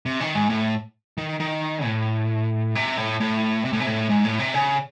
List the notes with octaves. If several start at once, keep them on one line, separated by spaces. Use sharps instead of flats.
C3
D#3
G#2
A2
D#3
D#3
A2
C3
A2
A2
C3
A2
C3
A2
G#2
A2
C3
C#3